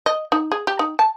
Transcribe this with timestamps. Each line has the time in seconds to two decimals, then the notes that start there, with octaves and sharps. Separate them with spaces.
0.06 D#5
0.32 D#4
0.52 G#4
0.67 G4
0.79 D#4
0.99 A5